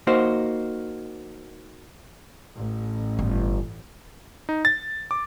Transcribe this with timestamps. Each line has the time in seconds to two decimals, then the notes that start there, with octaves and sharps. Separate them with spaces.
0.07 A#3 D#4 F#4 C5
2.55 A1
3.19 G1
4.49 D#4
4.65 A6
5.11 D6